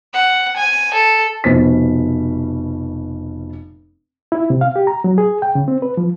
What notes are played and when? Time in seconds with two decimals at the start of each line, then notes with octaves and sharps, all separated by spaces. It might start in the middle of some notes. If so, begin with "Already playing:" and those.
0.14 F#5
0.56 G#5
0.94 A4
1.44 F1 B2 C5 B6
4.32 E4
4.50 C3
4.61 F5
4.76 G4
4.87 A#5
5.04 F#3
5.18 G#4
5.42 G5
5.55 C#3
5.68 C4
5.82 B4
5.97 F3